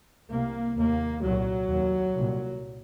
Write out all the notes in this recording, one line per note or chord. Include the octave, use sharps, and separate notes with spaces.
C2 C3 A#3
D#2 A#3
C2 A#2 F#3
D#2
C2 A#2